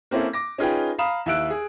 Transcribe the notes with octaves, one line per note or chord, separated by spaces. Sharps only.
A#3 C4 C#4 E4 A4
D6 A#6
C#4 D#4 F4 G#4 B4 G5
F5 A#5 B5 D#6 E7
D#2 E4 E5 E6 F#6 D7
G#4